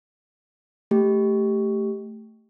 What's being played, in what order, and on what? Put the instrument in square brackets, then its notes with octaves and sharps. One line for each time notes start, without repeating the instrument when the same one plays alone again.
[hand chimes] A3 G4